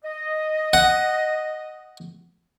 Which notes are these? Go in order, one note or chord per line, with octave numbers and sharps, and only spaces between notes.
D#5
F#5